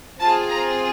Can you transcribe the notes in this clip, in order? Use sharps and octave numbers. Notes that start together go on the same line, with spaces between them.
C4 F4 G#4 A5
A#5